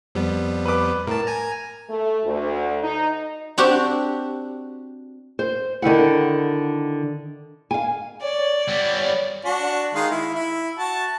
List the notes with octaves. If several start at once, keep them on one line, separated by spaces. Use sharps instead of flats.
F2 G3 B3
B4 D6
A2 A#4 A5
G#5 A#5
A3
D2
D#4
C4 D4 F#4 G4
C5
D3 D#3 E4 F#5
F5 G#5
C#5 D5
G3 B3
D4 F#4
D#3 G#3 F5
E4
E4
F#4 A5